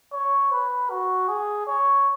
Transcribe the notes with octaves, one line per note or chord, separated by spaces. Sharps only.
C#5
B4
F#4
G#4
C#5